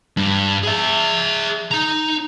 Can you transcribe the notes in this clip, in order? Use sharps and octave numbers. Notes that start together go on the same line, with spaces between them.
G2
G#4 E5
D#4 A#5